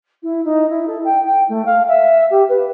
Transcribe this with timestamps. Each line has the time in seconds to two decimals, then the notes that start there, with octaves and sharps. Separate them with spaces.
0.23 E4
0.45 D#4
0.70 E4
0.88 A4
1.05 G5
1.24 G5
1.49 A3
1.66 F5
1.88 E5
2.31 G4
2.49 B4